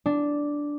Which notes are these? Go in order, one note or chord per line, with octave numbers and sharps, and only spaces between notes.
D4